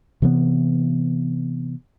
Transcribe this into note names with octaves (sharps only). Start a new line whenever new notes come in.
C3 E3 B3